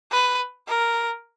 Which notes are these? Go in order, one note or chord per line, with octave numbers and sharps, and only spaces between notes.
B4
A#4